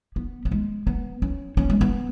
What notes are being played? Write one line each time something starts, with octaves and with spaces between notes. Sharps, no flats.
B3
B3
G#3
B3
C#4
C#4
G#3
B3